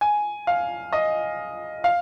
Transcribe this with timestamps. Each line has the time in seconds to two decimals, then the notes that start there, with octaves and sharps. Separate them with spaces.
0.01 G#5
0.47 F5
0.93 D#5
1.84 F5